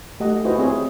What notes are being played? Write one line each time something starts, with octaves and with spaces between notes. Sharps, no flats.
A3 G4 D#5 F#5
E4 F#4 B4 C5 D#5 G#5
C4 G#4 C#5